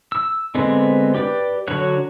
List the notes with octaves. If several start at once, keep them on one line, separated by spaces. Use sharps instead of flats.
E6
D3 G#3 B3 C4
G4 B4 D5
D3 F#3 F#4 C#5 F#6